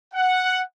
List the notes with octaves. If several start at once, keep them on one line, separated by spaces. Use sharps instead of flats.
F#5